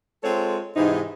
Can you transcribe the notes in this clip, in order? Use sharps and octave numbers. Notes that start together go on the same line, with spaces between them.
G#3 C4 F4 A4 C#5
G#2 C3 E3 D#4